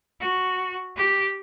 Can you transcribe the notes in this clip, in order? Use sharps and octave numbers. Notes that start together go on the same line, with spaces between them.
F#4
G4